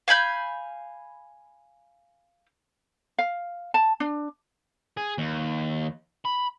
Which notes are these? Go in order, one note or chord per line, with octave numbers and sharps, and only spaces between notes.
F5 G#5 B5 G6
F5
A5
D4
G#4
D#2
B5